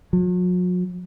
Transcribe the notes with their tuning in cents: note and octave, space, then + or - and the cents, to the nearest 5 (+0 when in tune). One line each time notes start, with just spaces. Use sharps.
F#3 -45